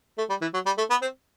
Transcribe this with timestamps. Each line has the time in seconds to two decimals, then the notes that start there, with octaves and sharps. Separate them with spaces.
0.18 A3
0.29 G3
0.41 E3
0.54 F#3
0.66 G3
0.78 A3
0.90 B3
1.02 C4